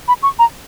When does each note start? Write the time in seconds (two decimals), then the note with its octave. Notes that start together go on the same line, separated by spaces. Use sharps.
0.08 B5
0.23 C#6
0.39 A#5